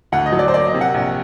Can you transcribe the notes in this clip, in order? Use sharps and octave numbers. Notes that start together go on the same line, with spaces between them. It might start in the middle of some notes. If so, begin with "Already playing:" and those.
D2 F#5
D#5
F#3
D5
C5
A#3 D5
D#5
C3
F#5
A#1